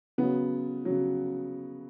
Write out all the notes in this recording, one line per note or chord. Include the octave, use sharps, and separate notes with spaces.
C#3 F#3 B3
C#3 F#3